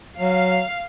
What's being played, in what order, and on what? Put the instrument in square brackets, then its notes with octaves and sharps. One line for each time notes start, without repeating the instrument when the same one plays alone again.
[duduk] F#3 [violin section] F5